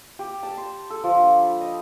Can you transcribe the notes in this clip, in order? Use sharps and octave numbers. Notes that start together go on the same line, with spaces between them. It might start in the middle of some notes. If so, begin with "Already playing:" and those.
G4
A5
C6
A4
F3
D4
B5
D#5